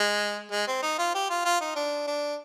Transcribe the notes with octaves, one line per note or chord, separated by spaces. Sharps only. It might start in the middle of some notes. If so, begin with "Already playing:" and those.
Already playing: G#3
G#3
C4
D#4
F4
G4
F4
F4
D#4
D4
D4